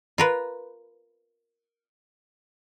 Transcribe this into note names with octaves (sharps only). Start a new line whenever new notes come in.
F4 A#4 B4